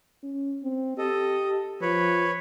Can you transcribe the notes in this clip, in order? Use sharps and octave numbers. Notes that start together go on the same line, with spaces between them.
C#4
C4
G4 A4 D#5
F3 B4 C#5